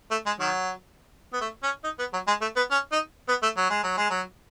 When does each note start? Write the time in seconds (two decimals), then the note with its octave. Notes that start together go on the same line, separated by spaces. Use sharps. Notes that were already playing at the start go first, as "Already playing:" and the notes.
0.11 A3
0.26 G#3
0.40 D#3 F#3
1.33 B3
1.41 A3
1.63 C#4
1.84 D#4
1.99 B3
2.13 F#3
2.27 G#3
2.41 A3
2.56 B3
2.71 C#4
2.92 D#4
3.29 B3
3.43 A3
3.57 F#3
3.70 G#3
3.83 F#3
3.97 G#3
4.10 F#3